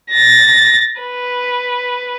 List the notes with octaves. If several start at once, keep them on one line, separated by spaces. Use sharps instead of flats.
A6 A#6
B4